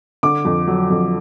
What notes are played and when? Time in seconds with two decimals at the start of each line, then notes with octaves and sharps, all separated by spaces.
0.23 D3 D6
0.45 F2
0.68 F#3
0.90 F2